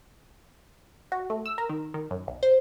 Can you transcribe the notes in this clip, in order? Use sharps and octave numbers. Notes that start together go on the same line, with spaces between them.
F#4
A3
E6
A#4
D#3
D#3
F#2
B1
C5